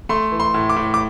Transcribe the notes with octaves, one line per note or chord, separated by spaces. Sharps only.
A3 C6
E3
C6
A2
D6
A2
D6